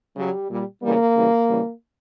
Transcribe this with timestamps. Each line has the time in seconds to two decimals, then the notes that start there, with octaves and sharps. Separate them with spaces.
0.15 C#3 F#3 G3
0.49 A#2 G3
0.82 C#3 E3 G3 A#3
1.15 C#3 E3 G3
1.48 C#3 E3 G3